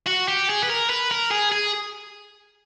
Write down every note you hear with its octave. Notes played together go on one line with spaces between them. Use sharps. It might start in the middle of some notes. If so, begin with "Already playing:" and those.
F#4
G4
G#4
B4
A#4
B4
A#4
G#4
G#4